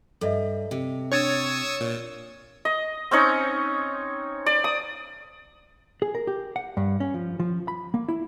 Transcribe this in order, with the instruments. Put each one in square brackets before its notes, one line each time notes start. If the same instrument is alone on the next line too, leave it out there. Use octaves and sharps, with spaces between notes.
[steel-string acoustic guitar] G2 [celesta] A4 D#5 E5
[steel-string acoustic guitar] C3
[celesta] D4 [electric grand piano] C#5 G#6 A6 [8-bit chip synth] C#6 D#6 E6
[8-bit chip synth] A#2
[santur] D#5
C4 C#4 D#4 C#5
D5
D#6
[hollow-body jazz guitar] G#4
A#4
G4
F#5
G2
C#4
F3
F3
B5
A#3
E4